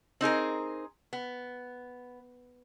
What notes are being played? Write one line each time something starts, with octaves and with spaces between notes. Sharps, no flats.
C4 D#4 G#4 A#4
B3